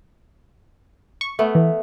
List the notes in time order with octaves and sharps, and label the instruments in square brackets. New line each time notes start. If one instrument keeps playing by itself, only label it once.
[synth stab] C#6
[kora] A3 B3
[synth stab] E3